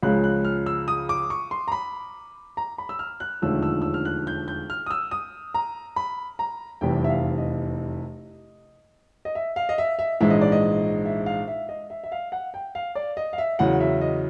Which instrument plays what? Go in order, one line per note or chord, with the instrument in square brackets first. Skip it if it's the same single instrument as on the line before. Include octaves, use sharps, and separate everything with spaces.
[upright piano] C#2 C#3 F3 G#3 F#6
F#6
F6
E6
D#6
D6
C#6
C6
A#5
B5
A#5
B5
E6
F6
F#6
E1 D#2 D3 F3 A3 E6
E6
E6
F6
F#6
G6
G6
F6
D#6
E6
D#6
A#5
B5
A#5
F1 E2 C3 E3 G3 G5
E5
F5
D#5
D#5
E5
F5
D#5
E5
E5
A#1 G#2 E3 G#3 E5
D#5
D5
D#5
E5
F5
E5
D#5
E5
E5
F5
F#5
G5
F5
D5
D#5
F5
E5
E2 C#3 F#3 F#5
E5
D#5